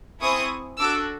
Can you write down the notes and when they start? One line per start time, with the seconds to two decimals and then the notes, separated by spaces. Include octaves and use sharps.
0.21 C4 E4 G#4 C#6 D#6
0.79 D4 F#4 A4 D6 E6